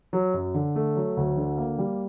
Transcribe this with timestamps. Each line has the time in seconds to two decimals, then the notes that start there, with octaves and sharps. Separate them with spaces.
0.13 F#3
0.34 F#2
0.54 D3
0.76 A3
0.96 F#3
1.17 D2
1.37 D3
1.58 A#3
1.78 G3